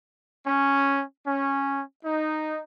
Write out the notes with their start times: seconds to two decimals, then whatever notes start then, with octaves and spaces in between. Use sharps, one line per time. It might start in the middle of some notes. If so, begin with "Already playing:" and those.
0.46 C#4
1.26 C#4
2.05 D#4